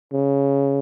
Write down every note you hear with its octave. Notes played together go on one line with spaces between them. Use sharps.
C#3